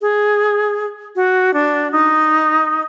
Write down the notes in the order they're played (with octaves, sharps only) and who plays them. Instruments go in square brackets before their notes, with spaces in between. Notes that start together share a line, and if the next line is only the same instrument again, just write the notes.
[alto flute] G#4
F#4
D4
D#4